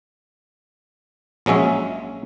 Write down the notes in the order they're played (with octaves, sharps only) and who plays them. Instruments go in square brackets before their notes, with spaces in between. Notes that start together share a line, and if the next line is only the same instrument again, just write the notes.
[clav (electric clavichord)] A#1 F#3 G#3 C#4 E5